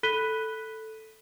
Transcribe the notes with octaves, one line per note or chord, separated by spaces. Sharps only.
A4 B5 F#6 B6 D#7 G7